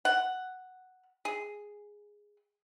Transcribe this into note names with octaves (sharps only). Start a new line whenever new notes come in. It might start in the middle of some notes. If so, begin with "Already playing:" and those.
F#5
G#4